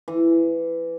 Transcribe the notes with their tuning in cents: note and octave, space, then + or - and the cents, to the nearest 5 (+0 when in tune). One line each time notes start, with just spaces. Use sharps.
E3 +15